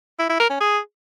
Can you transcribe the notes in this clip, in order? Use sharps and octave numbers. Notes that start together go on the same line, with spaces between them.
E4
E4
A#4
C#4
G#4